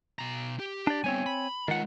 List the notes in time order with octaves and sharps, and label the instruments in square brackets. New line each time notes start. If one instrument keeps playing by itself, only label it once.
[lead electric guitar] B2 A#5
G4
[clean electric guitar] D4 D5
[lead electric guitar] G3 B3 [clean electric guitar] C4 C#5 G#5
[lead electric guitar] B5
[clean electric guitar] D#3 F#5 [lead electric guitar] G#3 F4